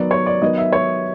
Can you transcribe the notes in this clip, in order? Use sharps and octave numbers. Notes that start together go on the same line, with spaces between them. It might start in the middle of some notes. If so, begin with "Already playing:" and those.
Already playing: D#3 F#3 B3 D5
C#5
D5
D#3 F#3 B3 D#5
E5
C#5